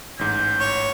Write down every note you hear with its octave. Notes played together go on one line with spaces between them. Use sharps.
A1 G#2 G6
C#5